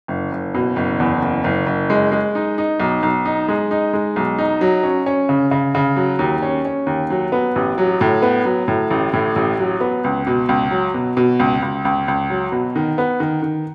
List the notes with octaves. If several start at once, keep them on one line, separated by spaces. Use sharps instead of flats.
F#1
F#1
B2
F#1
E2
F#1
F#1
F#1
G#3
G#3
D#4
D#4
B1
B1
D#4
G#3
D#4
G#3
B1
D#4
F#3
C#4
C#4
C#3
C#3
C#3
F#3
D#2
C#4
C#4
D#2
F#3
B3
A1
F#3
A2
B3
F#3
A2
A1
A2
A1
F#3
B3
C#2
B2
C#2
F#3
B2
B2
C#2
C#2
C#2
C#2
F#3
B2
D#3
B3
D#3
D#3